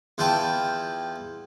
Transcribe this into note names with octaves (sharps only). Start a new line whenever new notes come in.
E2 E4 F4 G5 A5